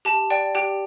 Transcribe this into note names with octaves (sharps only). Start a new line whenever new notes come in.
G4 A5
D5 G5
G4 G5